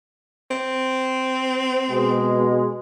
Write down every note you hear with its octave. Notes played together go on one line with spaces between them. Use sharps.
C4
B2 G#3